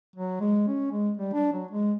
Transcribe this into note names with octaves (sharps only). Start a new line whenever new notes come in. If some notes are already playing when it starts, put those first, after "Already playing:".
F#3
G#3
C#4
G#3
G3
D4
F#3
G#3